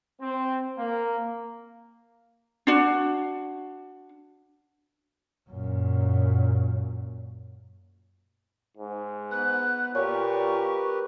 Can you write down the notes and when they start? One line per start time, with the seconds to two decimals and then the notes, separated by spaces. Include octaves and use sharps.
0.21 C4
0.78 A#3
2.67 D4 F#4
5.49 F#2 A#2
8.77 G#2
9.31 B3 B4 F#6
9.95 A#2 G4 A#4 B4 C#5 C#6